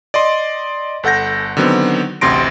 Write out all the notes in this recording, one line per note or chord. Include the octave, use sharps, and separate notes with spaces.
D5 D#5 C6
G1 A4 F#5 G6 A#6
D3 D#3 F#3 B3 C4
A1 D2 C3 C6 A#6 D7